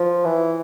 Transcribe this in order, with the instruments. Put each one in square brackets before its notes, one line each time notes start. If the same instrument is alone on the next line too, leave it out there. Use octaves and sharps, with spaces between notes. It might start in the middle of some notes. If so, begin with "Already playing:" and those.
Already playing: [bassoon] F3
E3